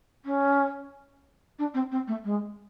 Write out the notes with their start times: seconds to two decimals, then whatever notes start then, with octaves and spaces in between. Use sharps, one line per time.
0.25 C#4
1.58 D4
1.74 C4
1.91 C4
2.07 A3
2.24 G#3